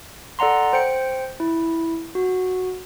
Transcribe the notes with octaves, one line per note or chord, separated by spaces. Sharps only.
A4 D5 F#5 A#5 C6
C5 G5 C#7
E4
F#4